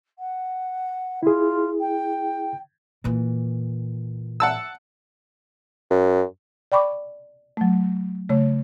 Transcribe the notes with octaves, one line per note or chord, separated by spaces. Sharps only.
F#5
E4 F4 G#4
G5
A#2 E3
F#5 A5 E6
F#2
D5 G5 B5 C#6 D6
F#3 A3
C#3 A3 C#5